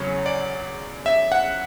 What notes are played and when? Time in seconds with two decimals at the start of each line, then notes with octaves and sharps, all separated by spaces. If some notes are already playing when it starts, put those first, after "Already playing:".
Already playing: E2 C#3 F#3 C#5
0.26 D5
1.06 E5
1.32 F#5